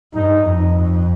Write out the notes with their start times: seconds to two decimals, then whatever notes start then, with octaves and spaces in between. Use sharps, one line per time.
0.13 G2 D#4
0.45 F2